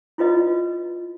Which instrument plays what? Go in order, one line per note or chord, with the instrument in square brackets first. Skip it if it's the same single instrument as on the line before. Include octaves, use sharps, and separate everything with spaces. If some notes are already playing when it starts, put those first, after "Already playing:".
[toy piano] E4 F4 B4 D#5